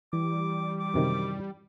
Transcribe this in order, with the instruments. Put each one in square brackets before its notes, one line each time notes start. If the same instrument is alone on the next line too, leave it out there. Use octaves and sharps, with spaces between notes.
[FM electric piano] E3 [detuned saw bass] G3 [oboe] D6
[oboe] D6
[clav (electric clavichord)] F#2 C3 D#3